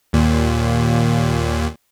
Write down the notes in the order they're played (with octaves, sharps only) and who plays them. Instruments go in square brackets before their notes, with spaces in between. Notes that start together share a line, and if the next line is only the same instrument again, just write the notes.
[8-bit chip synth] D#2 A#2